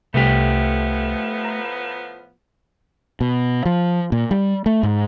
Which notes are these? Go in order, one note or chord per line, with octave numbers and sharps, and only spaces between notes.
C2 A2 F3 A3 B3 G4
A#5 B5
B2
F3
A#2
G3
A3
G#2